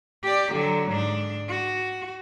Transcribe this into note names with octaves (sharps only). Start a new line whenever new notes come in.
G4 D5
D3 F#3
G#2 D4
F#4